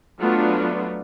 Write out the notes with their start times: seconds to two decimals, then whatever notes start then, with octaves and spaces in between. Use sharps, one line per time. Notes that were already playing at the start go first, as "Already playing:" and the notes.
0.20 F#3 A3 B3 D4 F4 F#4